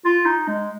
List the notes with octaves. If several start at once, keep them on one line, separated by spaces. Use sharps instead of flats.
F4
D#4
G#3